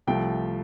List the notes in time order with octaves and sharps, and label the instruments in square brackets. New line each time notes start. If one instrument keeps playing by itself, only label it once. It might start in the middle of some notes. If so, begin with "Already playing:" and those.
[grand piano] C2 C3 F3 A3 G5